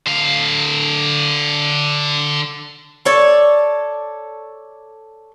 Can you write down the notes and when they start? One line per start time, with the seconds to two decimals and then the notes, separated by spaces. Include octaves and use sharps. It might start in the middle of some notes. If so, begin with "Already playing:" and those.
0.07 D3 F5
3.05 A4 C#5 D5